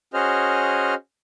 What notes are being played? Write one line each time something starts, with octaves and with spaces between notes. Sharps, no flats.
C#4 F#4 G#4 C5 D#5 F6